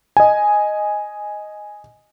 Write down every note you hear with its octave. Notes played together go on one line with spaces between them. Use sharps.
D#5 G#5